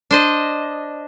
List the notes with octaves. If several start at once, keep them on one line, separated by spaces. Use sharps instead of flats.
D4 C5 D#5